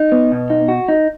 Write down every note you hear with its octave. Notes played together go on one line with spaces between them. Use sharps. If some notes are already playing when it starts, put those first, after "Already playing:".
Already playing: D#4
B3
B2
D#4
F#4
D#4